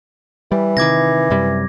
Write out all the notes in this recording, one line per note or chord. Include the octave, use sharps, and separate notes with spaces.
E3 G3
C3 D#3 D6 G#6 A#6
F#2 C3 G3